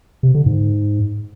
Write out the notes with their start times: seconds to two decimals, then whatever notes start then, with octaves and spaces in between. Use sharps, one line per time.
0.23 C3
0.34 D3
0.46 G#2